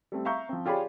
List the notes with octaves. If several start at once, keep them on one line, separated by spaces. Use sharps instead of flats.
G3 A3 C4
E5 F5 A#5 C#6 G6
F3 C4
F4 G4 G#4 C#5 D5 B5